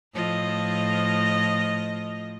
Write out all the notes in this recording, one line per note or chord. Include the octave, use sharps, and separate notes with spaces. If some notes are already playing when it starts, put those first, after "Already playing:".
A2 F3 D#5